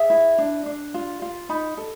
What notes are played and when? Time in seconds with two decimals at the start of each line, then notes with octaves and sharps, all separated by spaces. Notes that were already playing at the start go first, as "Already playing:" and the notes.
Already playing: G#4 E5
0.10 E4
0.38 D4
0.66 D4
0.94 F4
1.22 F4
1.49 D#4 B5
1.77 A4